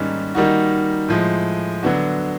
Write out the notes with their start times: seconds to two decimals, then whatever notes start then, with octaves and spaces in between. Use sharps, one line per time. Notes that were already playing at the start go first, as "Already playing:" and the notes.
Already playing: G#2 D#3 G3 A#3 C#4
0.35 D#3 G3 A#3 D#4 F#4
1.09 A2 F3 G#3
1.83 D3 F#3 B3 D4 F#4